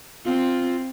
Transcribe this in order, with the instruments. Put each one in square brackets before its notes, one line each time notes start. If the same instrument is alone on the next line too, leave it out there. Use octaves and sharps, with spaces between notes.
[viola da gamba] C4 [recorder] F4